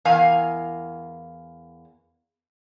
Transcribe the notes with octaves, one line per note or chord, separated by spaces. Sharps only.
E2 A#4 F5 G#5